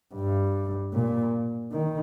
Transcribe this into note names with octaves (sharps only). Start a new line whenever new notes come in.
G2
A#2
D#3